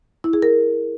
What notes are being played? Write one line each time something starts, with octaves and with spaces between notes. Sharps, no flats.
E4
G#4
A#4